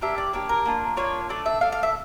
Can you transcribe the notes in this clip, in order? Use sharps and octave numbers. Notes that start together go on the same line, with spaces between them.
A#3 D4 G4 E5
D5
A#3 D4 G4 C#5
A#4
A#3 D4 F4
A#3 D4 F4 C#5
A3 D4 A4 D5
E5
A3 D4 A4 F5
F5
E5